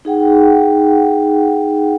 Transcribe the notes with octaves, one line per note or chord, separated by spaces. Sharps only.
D#4 G#4 F#5 G5